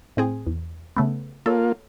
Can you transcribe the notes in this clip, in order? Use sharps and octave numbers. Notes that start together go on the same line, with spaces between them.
A2 C4 G#4
E2
C#3 A3 B3
A#3 F4 A4 C#5